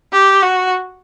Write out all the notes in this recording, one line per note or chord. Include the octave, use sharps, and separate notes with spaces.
G4
F#4